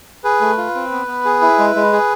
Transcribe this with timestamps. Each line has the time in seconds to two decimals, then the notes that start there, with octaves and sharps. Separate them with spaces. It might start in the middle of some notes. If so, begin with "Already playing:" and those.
0.24 G#4 B4
0.41 A3
0.57 F4
0.75 C4
0.92 B3
1.08 B3
1.25 G#4
1.42 E4
1.59 G#3
1.76 G#3
1.93 G#4